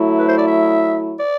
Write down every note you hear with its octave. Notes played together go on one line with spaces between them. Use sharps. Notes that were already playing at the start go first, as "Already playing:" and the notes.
Already playing: F#3 A3 E4
B4
C5
D5
E5
D5